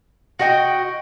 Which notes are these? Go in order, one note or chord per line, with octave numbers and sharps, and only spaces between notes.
F#4 D#5 G5